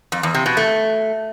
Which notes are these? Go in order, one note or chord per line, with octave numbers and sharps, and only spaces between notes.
F2
E2
C3
B2
A3